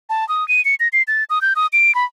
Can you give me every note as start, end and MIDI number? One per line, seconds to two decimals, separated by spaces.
0.10 0.27 81
0.29 0.46 87
0.48 0.63 99
0.65 0.75 97
0.80 0.88 94
0.93 1.02 96
1.08 1.24 93
1.30 1.41 87
1.42 1.54 91
1.56 1.67 87
1.73 1.94 98
1.95 2.05 83